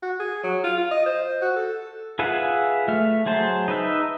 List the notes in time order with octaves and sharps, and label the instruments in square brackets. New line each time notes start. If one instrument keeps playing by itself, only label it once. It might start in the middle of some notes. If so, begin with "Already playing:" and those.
[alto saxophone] F#4
G#4
F#3
F4
F4
D#5
C5
F#4
A4
[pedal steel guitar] F4 G#4 B4 E5 F#5
A3 E5 F6
F#3 G#4 C5 A5
D#4 B4 E5